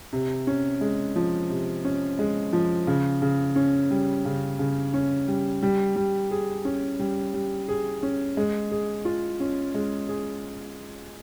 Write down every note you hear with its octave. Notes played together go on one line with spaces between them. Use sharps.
C3
C#4
G#3
F3
C3
C#4
G#3
F3
C#3
C#3
C#4
G3
C#3
C#3
C#4
G3
G3
G3
G#4
C#4
G3
G3
G#4
C#4
G#3
G#4
F4
C#4
G#3
G#4